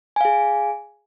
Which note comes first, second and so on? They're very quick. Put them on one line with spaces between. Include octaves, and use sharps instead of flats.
G#5 F5 G#4